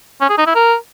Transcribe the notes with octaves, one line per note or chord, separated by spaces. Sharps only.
C#4
G#4
D#4
E4
A#4